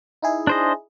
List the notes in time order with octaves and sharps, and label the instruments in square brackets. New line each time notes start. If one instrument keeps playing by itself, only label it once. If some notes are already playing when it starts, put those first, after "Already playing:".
[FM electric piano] D#4 E4 G#4
[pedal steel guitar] D4 C5 D#5